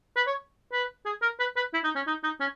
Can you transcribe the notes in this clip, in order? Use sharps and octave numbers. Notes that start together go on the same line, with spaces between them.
B4
C#5
B4
G#4
A#4
B4
B4
E4
D#4
C#4
D#4
D#4
C#4